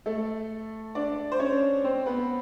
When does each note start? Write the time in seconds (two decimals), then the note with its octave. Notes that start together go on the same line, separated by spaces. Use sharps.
0.06 A3 A4
0.95 D4 D5
1.32 C5
1.39 C#4 C#5
1.84 C4 C5
2.06 B3 B4